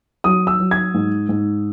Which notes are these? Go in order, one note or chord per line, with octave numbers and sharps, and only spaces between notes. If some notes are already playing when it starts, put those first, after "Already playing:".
F#3 D#6
E6
F#3
G#6
G#2
G#2